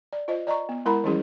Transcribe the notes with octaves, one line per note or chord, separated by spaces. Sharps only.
D5
F4 C5 D#5
D5 D#5 A#5 C#6
B3
G#3 E4 A#4 F#5 A#5 B5
E3 F3 G3 C#4 E4 G#4